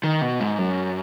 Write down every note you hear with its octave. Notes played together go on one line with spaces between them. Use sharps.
D#3
B2
G#2
F#2